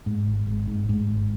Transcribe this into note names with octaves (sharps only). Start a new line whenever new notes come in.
G#2
G#1
G#1
G#2
G#2
G#1